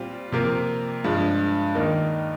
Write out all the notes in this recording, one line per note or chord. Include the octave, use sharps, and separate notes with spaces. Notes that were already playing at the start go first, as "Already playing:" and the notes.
Already playing: A#2 G3 C4 F4
C3 F3 A#3 F4 A#4
G2 F3 G#3
D#2 D#3 A#3 D#4 A#4